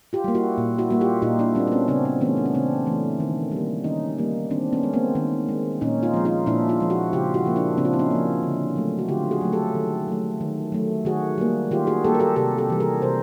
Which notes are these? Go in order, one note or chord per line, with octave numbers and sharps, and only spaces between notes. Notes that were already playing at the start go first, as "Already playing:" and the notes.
F4 G4
G3 A#3
E4 F#4
A#2
E4 F#4
G3 A#3 F#4
F4 G4
A#2 D#4 F4
D4 E4
G3 A#3 C4 D4
D4
B3 C#4
C#3 C4 D4
C4 D4
E3 A3 B3 C#4
D4
C#4
C#3 C4 D4
E3 A3
D#3
G3
A#3
D#3 C#4 D#4
G3 A#3
D#3 C4 D4
B3 C#4
G#3
A#3 C4
D#3
G#3
A#2 C#4 D#4
D#4 F4
F3 G#3
D#4 F4
A#2 D4 E4
D#4 F4
F3 G#3
E4 F#4
C#3 F4 G4
E4 F#4
F3 A#3
D4 E4
C#3 C4 D4
F4
E4
C#4 D#4
F3 A#3
D3
F#3 A3
F#4
D3 F4 G4
F#4 G#4
F#3 A3
G4 A4
D#3
F#3 A3
D#3
F#3 A3
D#3 F#4 G#4
G3 A#3
D#3 F4 G4
F#4 G#4
G3 A#3 G4 A4
A#4
G4 A4
C3 G4 A4
G4 A4
E3 G3
G#4 A#4
C3 A#4 C5